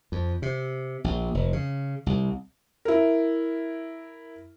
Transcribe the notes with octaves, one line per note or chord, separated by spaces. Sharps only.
F2
C3
A#1
F1
C#3
C2
E4 A#4